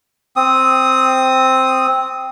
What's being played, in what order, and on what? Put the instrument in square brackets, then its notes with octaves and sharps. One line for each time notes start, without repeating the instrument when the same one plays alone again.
[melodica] C4 D#6